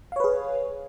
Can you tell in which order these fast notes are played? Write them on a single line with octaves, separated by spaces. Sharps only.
F5 C#5 B4 G#4